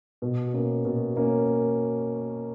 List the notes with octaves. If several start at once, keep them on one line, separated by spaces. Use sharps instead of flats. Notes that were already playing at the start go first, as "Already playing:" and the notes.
B2
A#3 C#4
B2
A#3 C#4